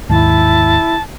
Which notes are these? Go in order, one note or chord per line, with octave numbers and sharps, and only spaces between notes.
D#2 G#2 E4 A5